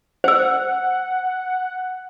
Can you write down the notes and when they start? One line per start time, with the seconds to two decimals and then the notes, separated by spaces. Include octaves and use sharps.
0.24 C5 F#5 E6